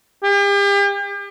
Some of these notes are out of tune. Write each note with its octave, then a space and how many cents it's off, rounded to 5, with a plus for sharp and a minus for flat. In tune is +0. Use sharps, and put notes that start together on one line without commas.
G4 +40